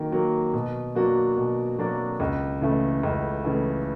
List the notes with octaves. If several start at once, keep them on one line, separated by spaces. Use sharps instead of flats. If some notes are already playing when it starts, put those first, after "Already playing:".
Already playing: D#3 F#3 A#3
F#3 A#3
B2
F#3 A#3 D4 F#4
B2
F#3 A#3 D4 F#4
C#2
C#3 E3 A3
C#2
C#3 E3 A3